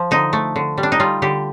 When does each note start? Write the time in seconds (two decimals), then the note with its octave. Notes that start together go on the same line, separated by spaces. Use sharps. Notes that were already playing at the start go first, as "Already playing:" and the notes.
Already playing: F3
0.11 D3 D#4
0.33 A3
0.56 D3
0.78 G3
0.83 D4
0.92 D#4
1.00 G3 F4
1.22 D3 G4